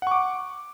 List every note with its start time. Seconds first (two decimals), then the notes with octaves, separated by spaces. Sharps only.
0.02 F#5
0.07 C#6
0.11 D6